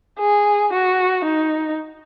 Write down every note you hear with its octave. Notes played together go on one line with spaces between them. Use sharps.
G#4
F#4
D#4